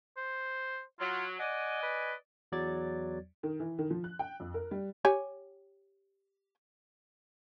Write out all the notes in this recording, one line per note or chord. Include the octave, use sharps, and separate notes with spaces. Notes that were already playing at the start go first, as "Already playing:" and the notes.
C5
F#3 F4
D5 D#5 F#5 G#5
B4
E2 F#3 D5 G#6 A6
D#3
E3
D#3
F3
F#6
G5
F2
A#4
G3
G4 C#5 G#5